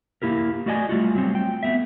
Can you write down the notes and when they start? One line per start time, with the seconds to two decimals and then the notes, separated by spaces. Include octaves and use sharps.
0.22 A#3 E4 G4 A#4
0.66 A3 F#4 D5 D#5 G#5
0.89 G3 A3 F4 F#4
1.15 F#3 G3 C4
1.35 G5
1.63 A3 B3 E5